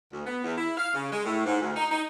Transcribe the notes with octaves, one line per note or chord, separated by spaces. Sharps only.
D2
B3
E2
E4
F5
C#3
G#3
A2
G#2
D2
D#4
D#4